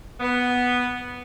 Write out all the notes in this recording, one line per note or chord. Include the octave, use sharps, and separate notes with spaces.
B3